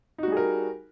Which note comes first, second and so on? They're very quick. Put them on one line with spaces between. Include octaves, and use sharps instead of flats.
D#4 F#4 G3 G#4 A#4